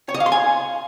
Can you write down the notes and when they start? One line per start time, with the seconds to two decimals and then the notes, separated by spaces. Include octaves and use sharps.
0.09 C#5
0.14 D#5
0.20 F5
0.26 C6
0.32 G#5